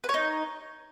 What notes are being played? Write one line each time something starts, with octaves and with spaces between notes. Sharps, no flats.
B4
C#5
D#4